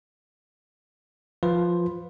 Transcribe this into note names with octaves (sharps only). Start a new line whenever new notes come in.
F3 F4 B4